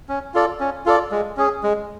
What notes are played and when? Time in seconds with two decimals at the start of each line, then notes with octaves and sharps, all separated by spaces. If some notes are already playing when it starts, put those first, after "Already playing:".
0.09 C#4
0.34 F4 A4 D5
0.60 C#4
0.86 F4 A4 D5
1.11 G#3
1.37 C#4 G#4
1.63 G#3